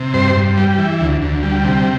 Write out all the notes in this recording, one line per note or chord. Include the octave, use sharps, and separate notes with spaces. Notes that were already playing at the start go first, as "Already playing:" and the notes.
Already playing: C3
G2 C5
G2
G3
E3
D2
D2
G3
C3